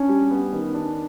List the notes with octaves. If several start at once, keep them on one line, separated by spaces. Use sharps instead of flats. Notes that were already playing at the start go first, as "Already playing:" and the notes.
Already playing: C#4 D4
G3
B3
D#3
D4